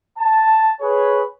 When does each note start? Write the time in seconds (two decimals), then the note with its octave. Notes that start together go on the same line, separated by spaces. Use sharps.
0.19 A5
0.81 G#4 B4 C#5